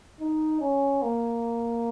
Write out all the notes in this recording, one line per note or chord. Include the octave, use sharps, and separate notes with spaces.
D#4
C#4
A#3